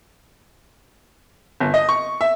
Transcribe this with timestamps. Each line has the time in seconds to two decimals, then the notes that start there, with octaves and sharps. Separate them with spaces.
1.60 G1
1.74 D#5
1.89 C#6
2.21 E5